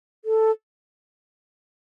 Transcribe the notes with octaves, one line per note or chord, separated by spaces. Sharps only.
A4